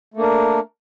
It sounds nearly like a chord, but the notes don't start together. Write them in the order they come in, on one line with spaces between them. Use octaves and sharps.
A3 A#3 D4 A#4